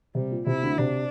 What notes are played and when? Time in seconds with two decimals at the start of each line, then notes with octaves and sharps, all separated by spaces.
0.15 C3 G3
0.31 A#2
0.46 C3 E4
0.62 D2 D3
0.78 C3 D4